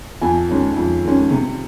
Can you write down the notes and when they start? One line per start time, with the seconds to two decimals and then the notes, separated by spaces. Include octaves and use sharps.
0.21 F2 G#5
0.49 D#3 G#3 C#4
0.77 F2
1.04 D#3 G#3 C#4
1.31 C3